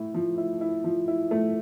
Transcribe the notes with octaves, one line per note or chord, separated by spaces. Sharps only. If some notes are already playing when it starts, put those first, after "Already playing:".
Already playing: A2 A3 E4
F3
E4
E4
F3
E4
A3